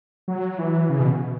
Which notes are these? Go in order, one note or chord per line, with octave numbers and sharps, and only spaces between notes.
F#3
E3
C#3
B2